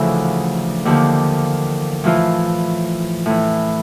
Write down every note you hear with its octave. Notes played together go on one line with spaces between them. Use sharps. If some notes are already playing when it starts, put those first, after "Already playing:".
Already playing: D2 C#3 E3 F3 E4
D#2 D3 F3
A2 E3 F3 F4
A2 E3